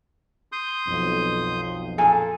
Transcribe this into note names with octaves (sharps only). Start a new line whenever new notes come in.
C6 D#6 G6
B1 F2
A#2 G#4 A4 G#5